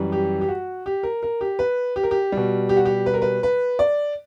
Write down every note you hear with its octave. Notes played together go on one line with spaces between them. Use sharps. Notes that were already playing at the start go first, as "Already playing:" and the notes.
Already playing: F#2 E3 G3
G4
G4
F#4
G4
A#4
A#4
G4
B4
G4
A#4
G4
B2 G3
G4
F#4
G4
B4
A#4
B4
B4
D5